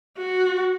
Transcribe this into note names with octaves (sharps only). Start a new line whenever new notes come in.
F#4